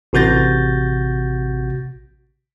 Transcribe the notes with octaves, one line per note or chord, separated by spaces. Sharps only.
A1 C3 F#4 G6 A6 A#6